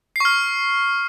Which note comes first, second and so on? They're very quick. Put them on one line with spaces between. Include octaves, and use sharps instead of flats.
C7 C#6 F6